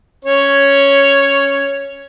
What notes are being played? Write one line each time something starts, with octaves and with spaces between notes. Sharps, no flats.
C#4 C#5